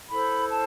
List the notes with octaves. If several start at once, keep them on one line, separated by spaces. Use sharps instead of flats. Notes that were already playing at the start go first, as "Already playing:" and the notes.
E4 A4 C5 B5
A5